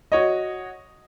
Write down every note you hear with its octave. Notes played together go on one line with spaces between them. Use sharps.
F#4 C#5 D#5